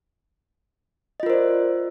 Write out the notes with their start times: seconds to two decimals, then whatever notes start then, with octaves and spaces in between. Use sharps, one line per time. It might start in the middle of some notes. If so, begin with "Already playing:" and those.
1.20 D#5
1.23 F4
1.26 A#4
1.30 C5
1.33 D5